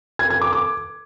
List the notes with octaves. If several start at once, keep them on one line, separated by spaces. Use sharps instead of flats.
G#6
G#6
D6
D6